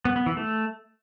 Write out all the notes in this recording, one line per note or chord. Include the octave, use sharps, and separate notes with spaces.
B3
B3
E3
A3